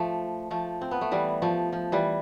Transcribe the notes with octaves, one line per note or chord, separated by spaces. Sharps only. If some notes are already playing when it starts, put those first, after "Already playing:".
Already playing: F3 A3
F3 A3
C4
B3
A3
E3 G3
F3 A3
F3
E3 G3